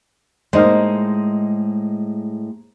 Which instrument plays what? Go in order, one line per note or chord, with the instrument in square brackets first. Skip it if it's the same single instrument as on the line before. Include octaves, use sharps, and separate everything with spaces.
[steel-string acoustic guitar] A2 G#3 [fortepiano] A#3 D#4 C5